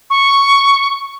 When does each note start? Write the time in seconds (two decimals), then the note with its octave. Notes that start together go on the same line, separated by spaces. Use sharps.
0.10 C#6